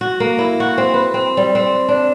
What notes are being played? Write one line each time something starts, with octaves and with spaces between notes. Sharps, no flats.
F#4
A#3
E4
F#4
C4
B4
C4
G3
C4
D4